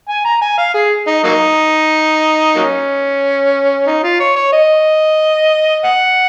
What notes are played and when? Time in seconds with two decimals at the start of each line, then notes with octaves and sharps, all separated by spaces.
0.09 G#5
0.25 A#5
0.41 G#5
0.58 F5
0.74 G#4
1.07 D#4
1.24 F#3 A#3 D#4
2.56 F#3 A#3 C#4
3.87 D#4
4.04 F4
4.20 C#5
4.36 C#5
4.53 D#5
5.84 F#5